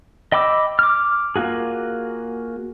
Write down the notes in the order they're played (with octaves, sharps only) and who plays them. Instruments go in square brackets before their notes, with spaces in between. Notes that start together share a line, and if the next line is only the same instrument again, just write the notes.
[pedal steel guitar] D#5 G5 B5 D6 E6
D6 F6
A#3 F4 F#4 G#4